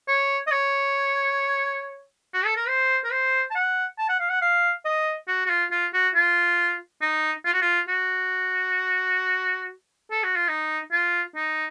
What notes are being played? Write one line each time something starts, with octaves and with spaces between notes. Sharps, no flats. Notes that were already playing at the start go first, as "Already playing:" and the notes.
C#5
D#5
C#5
F#4
A4
A#4
C5
A#4
C5
A5
F#5
A5
F#5
F5
F#5
F5
D#5
F#4
F#4
F4
F4
F#4
F4
D#4
F4
F#4
F4
F#4
A4
F#4
F4
D#4
F4
D#4